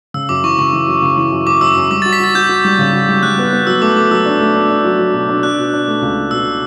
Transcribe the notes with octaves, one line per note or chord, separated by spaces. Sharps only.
C#3 E6
F#2 D6
E3 C#6
C#3 C#6
E3
F#2
C#3
E3
F#2
F#2 D6
F#2 E6
F#2
G3 D6
F#4 A6
B6
F#4 A6
F#4 G6
F#4
G3
C#3
F#4
G3
G3 F#6
B3
B3
F#3 E6
A3 D6
A3 D6
F#3 E6
D4
A3
D4
D4
F#3
F#3
B2
D4
D4 F#6
B2
D4
A3
C#2
B2
B2 E6
B2